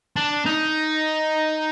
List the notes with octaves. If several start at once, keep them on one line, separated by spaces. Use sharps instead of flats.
D4
D#4